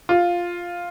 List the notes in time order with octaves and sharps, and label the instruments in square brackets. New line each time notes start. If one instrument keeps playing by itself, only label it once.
[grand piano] F4